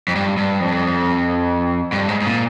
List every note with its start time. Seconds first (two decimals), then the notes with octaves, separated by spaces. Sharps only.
0.08 F2
0.15 G2
0.37 G2
0.60 F2
1.92 G2
2.09 G#2
2.21 G#2
2.26 A#2